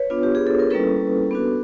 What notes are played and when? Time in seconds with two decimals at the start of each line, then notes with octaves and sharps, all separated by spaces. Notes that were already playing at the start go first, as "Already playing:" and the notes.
Already playing: B4 C#5
0.10 B3 D4 F4
0.23 G4
0.35 G#4
0.47 A4
0.59 A#4
0.70 G3 A#3 C#4 E4 A4 B4
1.31 B3 D4 F#4